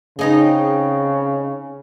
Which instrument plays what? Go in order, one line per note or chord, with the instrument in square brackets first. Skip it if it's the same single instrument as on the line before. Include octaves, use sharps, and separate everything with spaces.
[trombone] C#3 [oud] C4 D#4 G#4